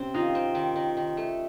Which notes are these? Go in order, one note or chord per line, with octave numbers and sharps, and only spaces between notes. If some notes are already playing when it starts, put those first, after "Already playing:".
Already playing: C3 C4 C#4
D#3 D#4 F4
C4
D#3
D#3
D#3
A3